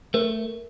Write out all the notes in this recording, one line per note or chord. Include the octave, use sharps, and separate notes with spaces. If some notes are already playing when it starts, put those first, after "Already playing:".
A3 A#4